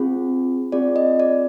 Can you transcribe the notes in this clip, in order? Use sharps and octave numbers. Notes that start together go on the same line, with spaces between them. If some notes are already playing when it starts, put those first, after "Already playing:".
Already playing: C4 F4 G#4
C4 F4 G#4 D5
D#5
D5